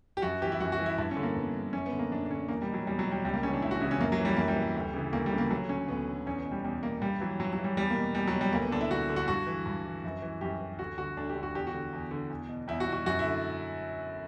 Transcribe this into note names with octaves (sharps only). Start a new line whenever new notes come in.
G4
F#2 F#4
E3 G4
E4
F#2 F#4
F#4
E3
E4
G2 E4
C#4
D3
A#3
G2 B3
D3
F#2 C#4
B3
D3
A#3
F#2 D4
D4
D3 C#4
E2 A#3
G3
B2
F#3
E2 G3
F#3
B2
G3
C#2 G3
A#3
C#3 E3 C#4
D4
C#2 E4
F#4
C#3 E3 E4
C#4
F#2 A#3
F#3
E3
G3
F#2 A#3
G3
E3
D2
C#3 E3
D2 A#3
G3
C#3 E3
A#3
D2 F#3
D3 C#4
D2 B3
D3
E2 C#4
B3
B2
G3
E2 G3
B2 A#3
G2 G3
E3 F#3
G2 F#3
F#3
E3
G3
E2 G3
A#3
B2
E2 G3
F#3
B2
G3
D2 A#3
B3
D3 D4
E4
D2 F#4
D3
F#4
G2 F#4
E3
G2
E3
F#2
E3
F#2 G4
E3
D2 F#4
D3 F#4
D2 D4
G4
D3
F#4
E2 G4
F#4
D3
E2
D3
E2
B2
E2 E4
F#4
B2
F#4
F#2 F#4
E4
D3